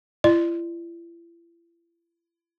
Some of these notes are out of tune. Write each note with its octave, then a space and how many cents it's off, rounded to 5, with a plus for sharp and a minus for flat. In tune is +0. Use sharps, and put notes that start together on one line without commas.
E4 +40 D5 +35